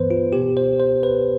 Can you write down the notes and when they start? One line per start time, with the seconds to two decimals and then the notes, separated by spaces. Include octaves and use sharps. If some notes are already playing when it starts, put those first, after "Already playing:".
Already playing: G2 E3 B3 B4 C5
0.10 F4
0.33 B2 B3 G4
0.57 C5
0.80 C5
1.03 B4